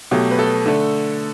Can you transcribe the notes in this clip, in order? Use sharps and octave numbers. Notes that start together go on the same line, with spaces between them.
B2 F#3 A3 G4
B4
A4
D3 A3